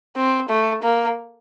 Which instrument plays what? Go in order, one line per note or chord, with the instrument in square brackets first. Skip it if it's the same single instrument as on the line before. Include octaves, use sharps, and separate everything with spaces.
[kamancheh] C4
A3
A#3